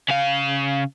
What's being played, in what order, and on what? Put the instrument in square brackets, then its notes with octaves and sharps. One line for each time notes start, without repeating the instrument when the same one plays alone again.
[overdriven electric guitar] C#3 F5